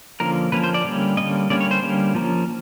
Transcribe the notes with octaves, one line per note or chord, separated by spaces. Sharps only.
D3 F3 A#3 C#4 A#4
D3 F3 A#3 C#4 B4
C5
D5
D3 G3 A#3 C#4
D3 G3 A#3 C#4 D#5
D3 G3 A#3 C#4 D5
C#5
C5
D3 G3 A#3 C#4
F3 A#3 C#4